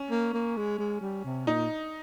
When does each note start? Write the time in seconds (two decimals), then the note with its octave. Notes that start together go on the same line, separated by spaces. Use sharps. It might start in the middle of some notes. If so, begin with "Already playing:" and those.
Already playing: C#4
0.10 A#3
0.33 A#3
0.57 G#3
0.79 G#3
1.01 G3
1.24 C3
1.46 A#2 D#4